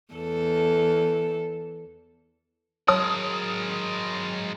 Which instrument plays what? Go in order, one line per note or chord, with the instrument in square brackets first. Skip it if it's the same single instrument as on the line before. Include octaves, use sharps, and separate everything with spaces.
[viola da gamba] E2 A4
[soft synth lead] F#3 [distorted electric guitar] G#3 A#4 [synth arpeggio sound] C#5 A5 F#6 [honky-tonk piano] D#6